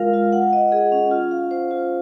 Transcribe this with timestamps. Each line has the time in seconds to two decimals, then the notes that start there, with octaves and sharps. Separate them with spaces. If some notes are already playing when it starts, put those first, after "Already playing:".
Already playing: G#3 F4 A#4 F5
0.13 F4
0.33 F#5
0.53 D#5
0.72 G#4
0.92 C#4
1.11 F4
1.31 F5
1.51 C5
1.71 F4